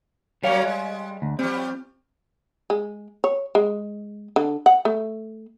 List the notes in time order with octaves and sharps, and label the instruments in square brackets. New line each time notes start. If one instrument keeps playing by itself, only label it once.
[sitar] F#3 A#3 C#4 [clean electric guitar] G3 C#5 F5
[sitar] G#3
[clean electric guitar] D2
[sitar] F3 G3 [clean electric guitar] C4
[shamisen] G#3
C#5
G#3
D3
F#5
A3